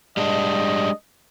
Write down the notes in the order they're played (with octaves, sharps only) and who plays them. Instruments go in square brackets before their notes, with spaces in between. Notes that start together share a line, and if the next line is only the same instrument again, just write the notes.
[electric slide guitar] G3 G#3 D4 [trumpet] D#5